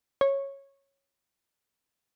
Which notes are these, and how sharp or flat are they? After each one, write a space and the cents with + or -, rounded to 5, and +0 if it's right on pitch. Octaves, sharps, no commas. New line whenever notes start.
C#5 -10